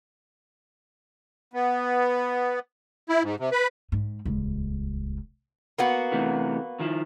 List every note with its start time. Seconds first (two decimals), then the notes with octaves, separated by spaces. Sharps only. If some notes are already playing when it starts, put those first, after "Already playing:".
1.54 B3
3.09 E4
3.23 G#2
3.40 C3
3.52 B4
3.92 G#2
4.25 D#1 C#2
5.78 A#3 B3 F#4
6.12 C3 E3 A3
6.80 D#3 F3 E4